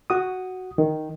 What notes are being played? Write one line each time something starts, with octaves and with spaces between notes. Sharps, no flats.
F#4 D#6
D#3